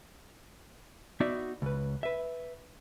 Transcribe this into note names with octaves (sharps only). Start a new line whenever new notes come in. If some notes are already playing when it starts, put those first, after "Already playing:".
B3 D#4 F#4 D5 E5
C#2 B4
B4 E5